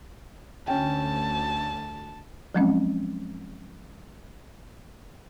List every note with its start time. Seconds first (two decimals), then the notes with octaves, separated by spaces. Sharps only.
0.68 D2 C#4 G5 A5
2.55 F3 F#3 G#3 C4 C#4